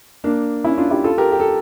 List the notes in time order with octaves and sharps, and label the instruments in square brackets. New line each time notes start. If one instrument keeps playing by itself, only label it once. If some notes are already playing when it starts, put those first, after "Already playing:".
[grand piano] A#3 D4
C#4 E4
D4 F4
E4 G4
F4 A4
G4 A#4
G4
A4